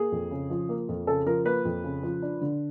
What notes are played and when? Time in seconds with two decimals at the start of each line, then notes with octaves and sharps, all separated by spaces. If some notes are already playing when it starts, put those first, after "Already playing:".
Already playing: A#3 G#4
0.12 F2
0.31 C#3
0.50 F3
0.69 A#3
0.89 F2
1.07 C#3 A4
1.26 F3 A#4
1.46 A#3 B4
1.65 F2
1.84 C#3
2.03 F3
2.22 D4
2.41 D3